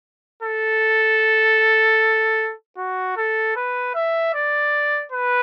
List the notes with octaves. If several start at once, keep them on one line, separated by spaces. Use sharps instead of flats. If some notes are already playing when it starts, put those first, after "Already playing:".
A4
F#4
A4
B4
E5
D5
B4